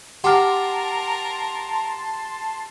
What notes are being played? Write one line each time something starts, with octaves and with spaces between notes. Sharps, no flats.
G4 A#4 F#5 A5 C6 D6 F6